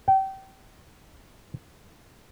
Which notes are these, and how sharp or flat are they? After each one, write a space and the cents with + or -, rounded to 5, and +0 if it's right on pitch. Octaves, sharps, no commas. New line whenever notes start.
G5 -25